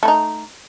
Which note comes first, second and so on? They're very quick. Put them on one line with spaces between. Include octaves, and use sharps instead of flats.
A3 E4 D#4